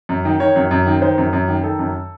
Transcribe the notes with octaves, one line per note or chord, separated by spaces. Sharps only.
F#2
D#3
D#3 C#5
F#2
F#2
D#3
D#3 C5
F#2
F#2
D#3
D#3 A4
F#2